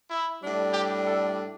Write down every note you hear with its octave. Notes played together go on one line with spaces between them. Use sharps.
E4
A2 G3 D4
G4
A4